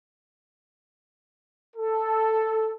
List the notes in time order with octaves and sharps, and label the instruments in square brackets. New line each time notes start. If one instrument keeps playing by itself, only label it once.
[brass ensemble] A4